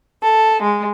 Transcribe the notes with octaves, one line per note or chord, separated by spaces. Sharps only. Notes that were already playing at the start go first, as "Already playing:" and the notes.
A4
G#3